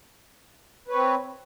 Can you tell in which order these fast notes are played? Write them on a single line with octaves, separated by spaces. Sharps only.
B4 C#5 C4